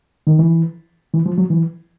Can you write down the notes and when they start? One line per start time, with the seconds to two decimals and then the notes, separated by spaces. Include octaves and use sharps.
0.27 D#3
0.39 E3
1.13 E3
1.26 F3
1.38 F#3
1.50 E3